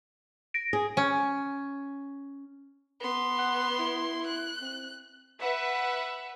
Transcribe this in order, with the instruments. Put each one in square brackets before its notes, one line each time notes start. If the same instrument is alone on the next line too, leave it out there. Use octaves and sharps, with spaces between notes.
[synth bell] A#6 D7
[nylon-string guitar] G#4
[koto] C#4
[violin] B3 C6
[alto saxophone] F#5
E4
[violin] F#6
[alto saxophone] C4
[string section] B4 E5 F#5